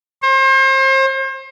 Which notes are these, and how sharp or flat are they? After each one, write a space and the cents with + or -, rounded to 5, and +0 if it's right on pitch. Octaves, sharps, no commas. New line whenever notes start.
C5 +35